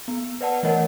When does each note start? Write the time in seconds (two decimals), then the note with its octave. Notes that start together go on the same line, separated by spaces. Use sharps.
0.08 B3
0.41 B4 D5 F#5 A5
0.63 E3 A3 A#4 C#5 D#5 F#5